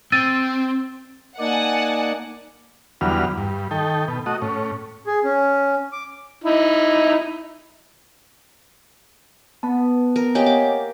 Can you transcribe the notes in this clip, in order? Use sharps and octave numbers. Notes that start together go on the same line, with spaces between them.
C4 E6 A6 D#7
A#3 D#4 D5 F#5 G#5 A5
E2 D3 F#3 G3 B3 F6
G2
D#3 A4 G5
B2
A3 F#4 D#5
A2 C#4
G#4
C#4
D6
D#4 E4
B3 A5
A#4
A#3 G4 C#5 D#5 G5 G#5
F#5 D6